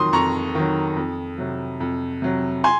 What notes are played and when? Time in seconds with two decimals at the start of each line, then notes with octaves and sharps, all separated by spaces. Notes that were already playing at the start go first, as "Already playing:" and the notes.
Already playing: F2 D#3 F#3 C6 D#6
0.13 F2 A#5 C#6
0.55 D#3 F#3
0.97 F2
1.38 C3 F#3
1.80 F2
2.22 C3 F#3
2.64 G#5 C6